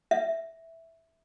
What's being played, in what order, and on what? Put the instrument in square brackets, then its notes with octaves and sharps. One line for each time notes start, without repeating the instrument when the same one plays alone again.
[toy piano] E5